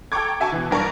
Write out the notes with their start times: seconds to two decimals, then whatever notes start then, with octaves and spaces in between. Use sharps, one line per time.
0.12 A4 G5 A#5 C#6 D6 G#6
0.40 F#4 E5 G#5 A5 C#6
0.52 B2 E3
0.70 B1 G2 A#4 D5 A5 C#6